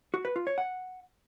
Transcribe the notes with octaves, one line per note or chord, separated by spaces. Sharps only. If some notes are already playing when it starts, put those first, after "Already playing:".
F#4
B4
F4
C#5
F#5